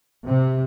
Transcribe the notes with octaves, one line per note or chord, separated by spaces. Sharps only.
C3